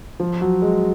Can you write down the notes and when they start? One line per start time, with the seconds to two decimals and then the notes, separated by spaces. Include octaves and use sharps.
0.20 F3
0.41 F#3
0.62 G#3